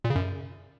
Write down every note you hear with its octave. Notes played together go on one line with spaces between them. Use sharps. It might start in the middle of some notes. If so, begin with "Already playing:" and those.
A#2
C#3
F#2